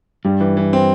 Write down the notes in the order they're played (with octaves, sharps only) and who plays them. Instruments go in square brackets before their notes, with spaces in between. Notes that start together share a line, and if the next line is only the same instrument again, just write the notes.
[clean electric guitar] G2 [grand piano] G3
[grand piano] E3
E3
C4